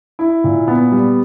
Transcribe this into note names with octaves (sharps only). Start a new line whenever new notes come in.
E4
A#2
B3
G3